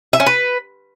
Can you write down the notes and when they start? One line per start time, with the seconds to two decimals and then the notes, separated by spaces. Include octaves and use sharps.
0.13 E5
0.20 C#4
0.26 B4